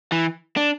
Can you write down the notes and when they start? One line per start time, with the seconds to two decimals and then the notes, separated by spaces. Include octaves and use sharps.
0.12 E3
0.57 D4